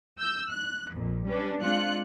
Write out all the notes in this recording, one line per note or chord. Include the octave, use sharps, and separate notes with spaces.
E6 G6
F#6
A#1 F2 A#2
G3 C#4 D4 B4
G#3 C4 D4 F4 F#6 C#7